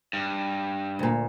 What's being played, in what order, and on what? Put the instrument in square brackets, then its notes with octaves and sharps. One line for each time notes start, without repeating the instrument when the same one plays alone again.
[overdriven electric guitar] G2
[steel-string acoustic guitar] D2 A#2